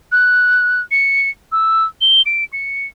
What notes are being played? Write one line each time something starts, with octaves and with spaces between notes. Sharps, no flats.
F#6
C#7
E6
G7
D7
C#7